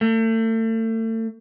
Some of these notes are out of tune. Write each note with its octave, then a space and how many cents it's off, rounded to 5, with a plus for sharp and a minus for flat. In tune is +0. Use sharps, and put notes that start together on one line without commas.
A3 +35